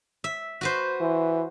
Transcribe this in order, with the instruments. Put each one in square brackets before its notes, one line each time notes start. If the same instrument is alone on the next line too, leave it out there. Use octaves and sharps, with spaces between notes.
[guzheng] E5
F#4 B4 C5
[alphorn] E3